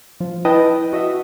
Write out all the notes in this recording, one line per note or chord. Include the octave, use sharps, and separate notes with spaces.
F3
E4 B4 D#5 G5 A5
F#4 D#5 E5